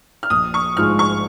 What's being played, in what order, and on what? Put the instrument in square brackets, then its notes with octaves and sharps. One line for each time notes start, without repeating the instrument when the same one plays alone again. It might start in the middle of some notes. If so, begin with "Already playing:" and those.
[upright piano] F6
[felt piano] A#1 [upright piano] D#6
[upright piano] C#6
[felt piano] G#2 F3 G#3 [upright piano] F6
[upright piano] C#6